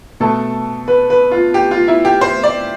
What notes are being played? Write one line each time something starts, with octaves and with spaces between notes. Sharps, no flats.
B2 A3 A4
B4
B4
F4
G4
F4
E4
G4
C5
D5